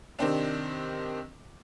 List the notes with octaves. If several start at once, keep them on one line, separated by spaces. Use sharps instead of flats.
C3 D#3 C4 D4